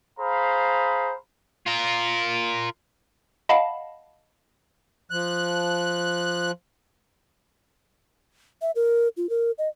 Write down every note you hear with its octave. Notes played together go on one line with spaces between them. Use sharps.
G#4 C5 F5 A#5 B5
F4 A#4
D#5 F5 F#5 A5 B5
F3 F#6
E5
A#4
F4
A#4
D#5